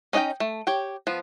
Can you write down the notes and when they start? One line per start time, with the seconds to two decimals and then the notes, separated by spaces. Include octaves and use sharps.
0.13 C#4 D#4 D#5 F5 G5
0.40 A3
0.67 G4 C#5 G5
1.07 F3 B3